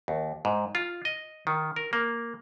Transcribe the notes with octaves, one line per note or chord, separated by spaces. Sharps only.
D#2
G#2
F4
D#5
D#3
A#4
A#3